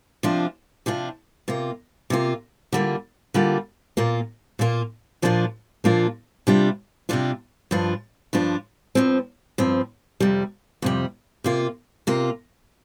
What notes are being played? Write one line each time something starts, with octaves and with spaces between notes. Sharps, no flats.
C3 F3 D4 F4
C3 F3 D4 F4
C3 A#3 F4
C3 A#3 F4
D3 G3 A#3 F4
D3 G3 A#3 F4
A#2 A#3 F4
A#2 A#3 F4
A#2 F3 A#3 D4 F4
A#2 F3 A#3 D4 F4
C3 G3 D4 F4
C3 G3 D4 F4
G2 F3 D4 F4
G2 F3 D4 F4
G2 F3 C4
G2 F3 C4
F2 C3 G3
F2 C3 G3
C3 A#3 F4
C3 A#3 F4